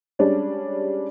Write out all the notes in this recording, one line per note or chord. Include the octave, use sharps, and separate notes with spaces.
G3 G#3 C#4 D4